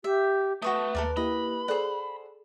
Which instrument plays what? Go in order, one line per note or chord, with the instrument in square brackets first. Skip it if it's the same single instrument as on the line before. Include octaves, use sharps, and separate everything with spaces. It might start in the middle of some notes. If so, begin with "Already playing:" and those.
[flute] G4 [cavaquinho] E5
[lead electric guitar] A3 [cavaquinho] F#4 C#6 D#6 [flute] B4
[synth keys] D#2 [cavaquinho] A4 A#4 D5
[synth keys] A#3 E4 G4 [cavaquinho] D#5 [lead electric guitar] B5
[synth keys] G#4 A4 D5 [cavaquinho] C5 F#5